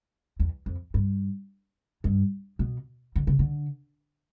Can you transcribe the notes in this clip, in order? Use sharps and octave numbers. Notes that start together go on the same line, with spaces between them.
E2
F2
G2
G2
B2
D3
C#3
D3